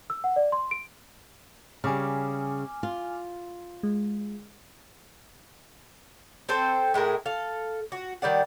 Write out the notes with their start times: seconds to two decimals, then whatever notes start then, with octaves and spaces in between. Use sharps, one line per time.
0.10 E6
0.24 F#5
0.36 D5
0.52 C6
0.71 D7
1.84 C#3 G3 G#5 D6 F6
2.83 F4
3.83 G#3
6.49 C4 A4 C5
6.94 A2 G#3 E4 A#4
7.26 A4 F5
7.92 F#4
8.22 D#3 G3 D5 F#5